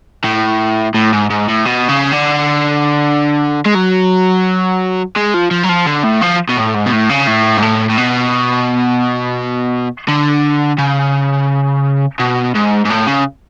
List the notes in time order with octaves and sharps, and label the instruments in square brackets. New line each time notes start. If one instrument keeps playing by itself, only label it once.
[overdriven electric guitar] A2
A2
G#2
G#2
A2
B2
C#3
D3
G#3
F#3
G#3
F3
F3
F#3
F3
D3
A2
F3
B2
A2
G#2
B2
A2
C#3
A2
G#2
A2
A2
B2
D3
C#3
B2
G#2
G#2
A2
C#3